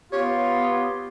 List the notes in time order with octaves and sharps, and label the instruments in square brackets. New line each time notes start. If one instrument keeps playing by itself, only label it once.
[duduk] B3 [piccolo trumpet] F4 [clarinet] G4 [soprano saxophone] C#5